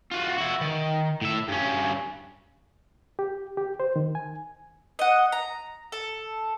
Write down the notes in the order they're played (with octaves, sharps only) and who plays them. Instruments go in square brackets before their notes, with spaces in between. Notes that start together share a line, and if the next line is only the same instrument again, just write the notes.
[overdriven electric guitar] F4 F#4
E4 F#4
D#3
A2 E5
G2 C#4
[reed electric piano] G4
G4
C5
D#3
G#5
[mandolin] D#5 F#5
A#5
A4